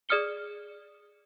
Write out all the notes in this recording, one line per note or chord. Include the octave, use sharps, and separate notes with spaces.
G#4 D5 D#6 F6 C#7 G7